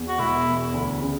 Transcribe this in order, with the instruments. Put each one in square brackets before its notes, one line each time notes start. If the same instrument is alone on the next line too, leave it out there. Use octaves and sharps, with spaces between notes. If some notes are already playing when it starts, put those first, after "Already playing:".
Already playing: [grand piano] E2
[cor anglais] F#4
[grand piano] E1 [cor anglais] E4
[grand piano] E2
D2
C#3